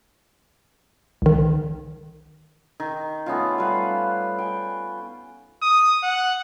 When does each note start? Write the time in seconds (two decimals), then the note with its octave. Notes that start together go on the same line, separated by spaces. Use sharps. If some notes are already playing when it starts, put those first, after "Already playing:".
1.22 C2 D#3
2.80 D#3
3.26 A3 B3 C#4 F4
3.58 G3 B4 F5
4.38 G5 G#5
5.62 D#6
6.03 F#5